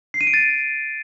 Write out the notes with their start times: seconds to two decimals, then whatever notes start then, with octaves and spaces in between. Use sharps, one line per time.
0.14 C7
0.21 D#7
0.27 D7
0.34 A6